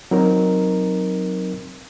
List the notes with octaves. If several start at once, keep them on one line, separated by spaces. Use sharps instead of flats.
F#3 C4 D#4 A#4